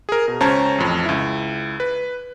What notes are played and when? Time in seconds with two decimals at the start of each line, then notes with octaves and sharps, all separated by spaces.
0.09 G#4 A#4
0.28 B2
0.40 C#2 C#4 C5 A5 A#5 G#6
0.78 A1 F2
1.05 C#2 E4
1.80 B4